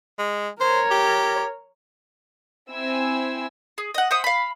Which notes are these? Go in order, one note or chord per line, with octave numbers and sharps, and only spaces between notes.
G#3
A#4 C5 C#5
G4
C4 E4 G#5 E6
G#4
D#5 F#5
C5 E5 F#5 D#6
F5 B5